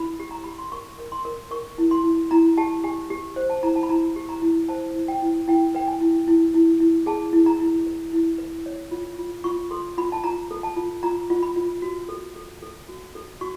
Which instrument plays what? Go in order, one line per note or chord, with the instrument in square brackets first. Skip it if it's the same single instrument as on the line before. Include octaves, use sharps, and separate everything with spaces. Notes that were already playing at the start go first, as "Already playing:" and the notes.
Already playing: [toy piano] E4 B5
G4
A#5
G4 B5
C6
A#4 C#6
A#4
C6
A#4
A#4 C#6
E4
C6
E4
E4 A#5
G4 A5
G4 G#5
G4
C5
A5
E4 A#5
A5
B5
E4 A#5
G4
A#5
E4
C5 A5
E4
G5
E4
E4 G5
B4 G5
G#5
E4
E4
E4
E4
G#4 A5
E4
A#5
E4
B4
E4
B4
C#5
F4
F4
F4 C#6
A4 C6
F4 B5
A5
F4 A#5
A4
A5
F4
F4 A#5
F4
B5
F4
F#4
A4
A4
A4
F#4
A4
F#4 C#6